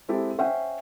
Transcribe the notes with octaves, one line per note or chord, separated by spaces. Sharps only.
G#3 C4 E4 G4 A4
C#4 C5 E5 F#5 G5